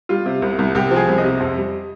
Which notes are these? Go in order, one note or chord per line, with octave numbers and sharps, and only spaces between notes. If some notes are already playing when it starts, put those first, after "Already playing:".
G3 F4
C3
C2
C2
C2 G4
F3
G#4
C2
D#5
C3
F2
G3